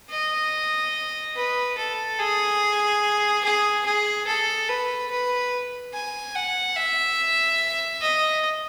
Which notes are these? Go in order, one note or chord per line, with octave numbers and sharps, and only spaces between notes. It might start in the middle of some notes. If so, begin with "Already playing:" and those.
D#5
B4
A4
G#4
G#4
G#4
A4
B4
B4
G#5
F#5
E5
D#5